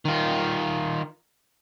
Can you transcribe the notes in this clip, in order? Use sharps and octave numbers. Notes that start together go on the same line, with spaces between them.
D#3 F4